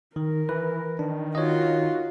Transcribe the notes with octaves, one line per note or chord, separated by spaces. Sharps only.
D#3 A#4
E3 B4
D#3 D4
D#4 F4 F#4 C#5 D#5